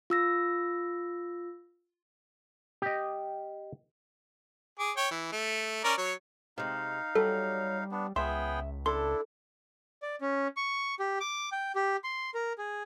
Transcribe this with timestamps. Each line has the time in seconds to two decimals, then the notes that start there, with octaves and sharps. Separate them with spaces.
0.10 F4 E6 A#6
2.82 G4 D#5
4.79 G#4 D6
4.97 C#5 G5
5.11 E3
5.32 A3
5.84 C#4 A#4 D5
5.98 F#3 C#5
6.58 C3 G#3 D#4 F5
7.15 F#3 G3 A4
7.92 B3 D4
8.16 C#2 B3 G#4 E5 G5 C6
8.86 D4 E4 A4 C6
10.02 D5
10.21 C#4
10.57 C#6
10.99 G4
11.20 D6
11.52 G5
11.75 G4
12.04 C6
12.34 A#4
12.58 G#4